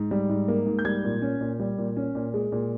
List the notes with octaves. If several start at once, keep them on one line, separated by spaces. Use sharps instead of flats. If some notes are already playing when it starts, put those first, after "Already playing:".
Already playing: G#2
G3
G#2
A#3
G#2
G6
G3 G#6
A#2
C#4
A#2
G3
A#2
C#4
A#2
G#3
A#2